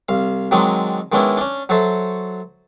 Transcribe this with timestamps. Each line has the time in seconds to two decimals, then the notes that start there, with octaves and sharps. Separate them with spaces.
0.09 C2 F5
0.51 D#3 F#3 G#3 C4 D4 D#4
1.12 D#3 G#3 B3 C#4 D4 E4
1.37 C#4 D4
1.69 F#3 F#4 A4 C5 E5